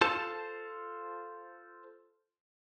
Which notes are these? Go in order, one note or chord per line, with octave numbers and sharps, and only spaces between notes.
F4 A4 C5 A5